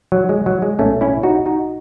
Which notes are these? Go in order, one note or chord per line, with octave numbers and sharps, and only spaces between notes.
F#3
G#3
F#3
G#3
B1 A2 E3 A3 C#4
C#4 E4
D#4 F#4
D#4 F#4